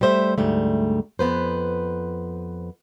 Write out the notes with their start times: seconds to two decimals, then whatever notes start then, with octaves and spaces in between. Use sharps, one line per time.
0.01 G3 A3 C5 D#5 E5
0.38 D2 G#2 G3 A3
1.19 F2 B3 B4 C5